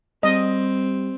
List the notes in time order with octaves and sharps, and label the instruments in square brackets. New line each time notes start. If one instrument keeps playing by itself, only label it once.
[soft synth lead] G3 [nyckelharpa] C4 [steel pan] D#5